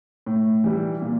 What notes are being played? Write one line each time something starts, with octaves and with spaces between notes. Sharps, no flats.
A2
E3 G3
A#2